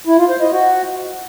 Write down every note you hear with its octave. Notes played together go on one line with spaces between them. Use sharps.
E4
F4
C5
D#5
F#4